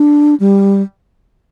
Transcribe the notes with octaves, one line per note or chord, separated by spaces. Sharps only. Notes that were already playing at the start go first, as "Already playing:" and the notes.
Already playing: D4
G3